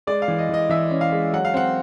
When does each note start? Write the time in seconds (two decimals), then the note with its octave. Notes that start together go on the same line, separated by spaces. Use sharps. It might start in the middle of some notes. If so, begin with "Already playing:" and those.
0.07 G#3 D5
0.22 F5
0.28 E3
0.39 D#5
0.49 E3 D#5
0.69 E3 E5
0.91 C#4
1.01 F5
1.12 G#3
1.33 F#3 F#5
1.45 F5
1.54 C4 F#5